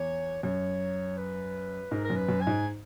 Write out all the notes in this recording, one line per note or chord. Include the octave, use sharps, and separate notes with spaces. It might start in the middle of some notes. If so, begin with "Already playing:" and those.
Already playing: E2 C#5
F#2 C#5
B4
G#2 A#4
A#4
F#2
B4
F#2
G#5
G#2